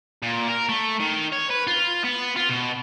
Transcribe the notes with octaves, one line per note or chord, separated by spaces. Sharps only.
A#2
A#4
A3
D#3
C#5
B4
F4
B3
F4
B2